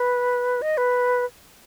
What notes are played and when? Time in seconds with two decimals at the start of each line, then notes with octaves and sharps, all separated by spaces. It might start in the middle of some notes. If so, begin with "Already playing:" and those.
Already playing: B4
0.62 D#5
0.78 B4